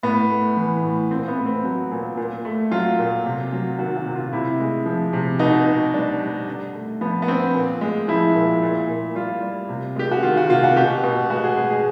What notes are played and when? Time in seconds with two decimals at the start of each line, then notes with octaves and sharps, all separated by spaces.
0.03 A2 B3
0.30 A3
0.57 E3
0.83 A2
1.11 A#2 C4
1.28 B3
1.37 A3
1.46 C4
1.64 F#3
1.91 A#2
2.17 A#2
2.45 A3
2.71 F#3 F4
2.99 A#2
3.26 C3
3.52 F#3
3.79 D#3 F#4
3.97 F#4
4.06 C3
4.15 F4
4.33 C3 E4
4.60 G#3
4.86 F3
5.13 C3
5.39 B2 D#4
5.66 B2
5.94 G3 D4
6.21 G3
6.47 D3
6.74 A3
7.01 F3 B3
7.22 B3
7.28 D3 C4
7.54 A#2
7.81 G#3
8.08 F3 E4
8.35 A#2
8.63 A#2
8.89 A#2
9.15 G3 F4
9.42 G3
9.69 C3
9.96 G#3 G4
10.11 F#4
10.23 D#3 F4
10.37 F#4
10.49 C3 F4
10.63 F#4
10.76 B2 G4
11.03 B2
11.30 G#3 F#4
11.44 G#4
11.57 G#3 G#4
11.70 G#4